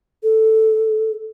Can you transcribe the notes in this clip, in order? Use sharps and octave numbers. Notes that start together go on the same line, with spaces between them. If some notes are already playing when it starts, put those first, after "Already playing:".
A4